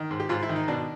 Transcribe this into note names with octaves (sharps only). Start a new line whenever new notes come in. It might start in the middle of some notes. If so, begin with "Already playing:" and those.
Already playing: D#3
G#2
G4
G#2 F4
E4
D#3
D#4
B2 D4